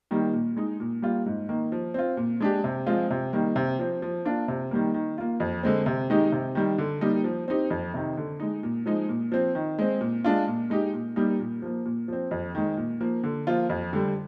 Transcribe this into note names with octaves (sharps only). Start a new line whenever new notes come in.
D#3 G3 A#3
A#2
G#3 D#4
A#2
G3 A#3 F4
G#2
D#3 A#3
F3
C4 F4
A#2
G#3 D4 G4
C3
F3 G#3 C4 F4
C3
D#3 G3 A#3
C3
F3 C4
F3
A#3 D4 F4
C3
D#3 G3 A#3
D#3
A#3 F4
F2
D3 G#3 C4
C3
D#3 G#3 D#4 G4
C3
D#3 G3
D3
G3 A#3 D#4 G4
F3
C4 D#4 G4
F2
C3 D#3
D3
G#3 D#4
A#2
F3 G#3 D#4
A#2
F3 C4
D#3
G#3 C4
A#2
G#3 D4 F4
A#2
G#3 D#4 G4
A#2
G3 A#3 D#4 G4
A#2
F3 A#3
A#2
F3 C4
F2
D#3 G#3
A#2
F3 A#3
D3
F3 A#3 F4
F2
D3 G3